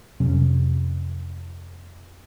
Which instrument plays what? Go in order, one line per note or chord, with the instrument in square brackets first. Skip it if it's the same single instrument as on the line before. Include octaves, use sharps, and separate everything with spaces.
[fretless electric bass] F2 C3 F#3 C#4